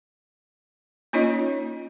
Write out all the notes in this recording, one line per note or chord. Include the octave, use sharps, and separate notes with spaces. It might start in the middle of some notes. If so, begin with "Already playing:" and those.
A#3 C#4 D#4 F4 C#5 D#5